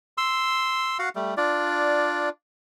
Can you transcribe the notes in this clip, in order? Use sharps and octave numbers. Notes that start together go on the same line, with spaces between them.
C6 E6
F#4 F5 F#5
G3 A3
D4 F4 D5